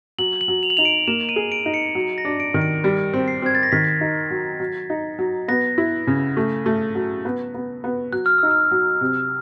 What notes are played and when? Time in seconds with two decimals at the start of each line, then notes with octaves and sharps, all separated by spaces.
0.18 F#3 F#7
0.41 F#7
0.48 F#3
0.63 F7
0.70 F#7
0.77 D#4 F7
0.85 D7
1.07 A#3 E7
1.29 D#7
1.36 G#4
1.52 D7
1.66 D#4
1.74 C#7
1.95 F#3
2.18 A#6
2.25 D4
2.40 D7
2.54 D#3
2.62 D7
2.84 G3
3.13 C4
3.28 C7
3.42 C4 G#6
3.55 A6
3.63 A#6
3.72 D#3 B6
4.01 D#4
4.30 F#3
4.60 F#3
4.90 D#4
5.19 F#3
5.48 B3 A#6
5.78 E4
6.07 C#3
6.37 A3
6.66 A3
6.95 F#3
7.25 B3
7.54 B3
7.84 B3
8.12 F#3 F#6
8.26 F6
8.38 D#4 E6
8.51 F6
8.71 F#3
9.01 C3